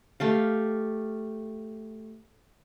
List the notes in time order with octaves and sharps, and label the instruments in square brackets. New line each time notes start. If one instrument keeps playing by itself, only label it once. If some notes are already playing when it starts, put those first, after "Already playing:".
[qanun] A3 G4 F5